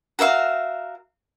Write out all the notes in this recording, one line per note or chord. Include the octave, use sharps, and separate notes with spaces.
F#4 A#4 E5 F5